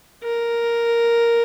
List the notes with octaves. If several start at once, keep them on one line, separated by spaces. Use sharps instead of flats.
A#4